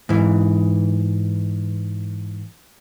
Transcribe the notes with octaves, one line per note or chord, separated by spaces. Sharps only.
G#2 E3